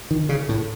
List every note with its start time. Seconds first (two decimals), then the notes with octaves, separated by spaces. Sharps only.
0.11 D#3
0.29 C#3
0.49 A2